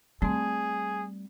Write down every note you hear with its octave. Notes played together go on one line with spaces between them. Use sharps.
G3 A3 C4 G#4